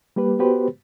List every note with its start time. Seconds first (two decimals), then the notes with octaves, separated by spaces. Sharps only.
0.16 G3 A#3 G4 B4
0.39 B3 F#4 G4 B4 C5